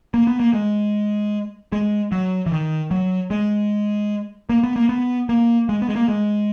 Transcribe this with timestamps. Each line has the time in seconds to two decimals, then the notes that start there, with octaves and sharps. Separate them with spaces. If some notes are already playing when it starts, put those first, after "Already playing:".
0.14 A#3
0.27 B3
0.40 A#3
0.53 G#3
1.72 G#3
2.12 F#3
2.46 E3
2.52 D#3
2.91 F#3
3.30 G#3
4.49 A#3
4.64 B3
4.76 A#3
4.89 B3
5.29 A#3
5.69 G#3
5.82 B3
5.89 G#3
5.96 A#3
6.09 G#3